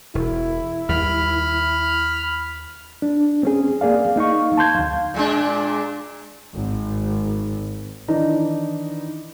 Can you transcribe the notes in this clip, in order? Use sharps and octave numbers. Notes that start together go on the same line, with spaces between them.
E1 E4
D#2 G3 B5 F6
D4
C4 C#4 G#4
A#3 G#4 D5 F5
A#3 D#4 F5 C#6
A5 C6 G6 G#6
D2 F5
A#2 G#3 D4
G#1
D#3 E3 D4 D#4